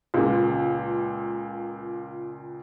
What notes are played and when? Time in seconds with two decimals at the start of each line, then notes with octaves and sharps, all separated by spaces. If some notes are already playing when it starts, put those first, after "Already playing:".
0.14 C#2 A#2